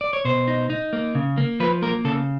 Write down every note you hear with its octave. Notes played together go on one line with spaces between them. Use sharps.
D5
C#5
B2 C5
D#4
D#4
A#3
C#3
A#3
F3 B4
A#3 A#4
C#3 A4